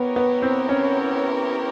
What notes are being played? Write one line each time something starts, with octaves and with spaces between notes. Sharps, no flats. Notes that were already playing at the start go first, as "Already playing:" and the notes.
Already playing: B3 E4 G4 A#4 C#5
B3
C4
C#4